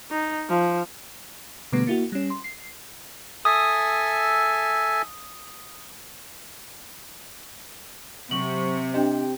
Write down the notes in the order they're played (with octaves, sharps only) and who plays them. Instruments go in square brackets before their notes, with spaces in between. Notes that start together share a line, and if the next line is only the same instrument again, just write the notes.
[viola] D#4
F3
[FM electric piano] B2 D3 G3 A3 B3
A#3 E4 F#4
G3 C#4
C6
C7
[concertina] A4 E5 G#5 [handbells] D#6
[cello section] C3 [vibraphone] F#3 C#6 [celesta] F#7
[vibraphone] C4 G4 G5 [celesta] D4 D#5